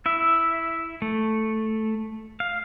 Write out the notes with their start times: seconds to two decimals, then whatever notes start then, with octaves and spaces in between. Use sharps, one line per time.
0.06 E4 E5
1.02 A3
2.40 F5